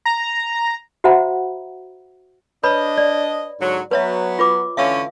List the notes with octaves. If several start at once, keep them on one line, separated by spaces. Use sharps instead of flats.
A#5
F#4 C5 E5 F#5 A#5 B5
D4 B4 C#5 D#5 B5
D5
G#2 D3 F#3
F#3 B3 B4 C#5 E5
F4 B4 D6
D3 E3 C#4 E5 F5 E6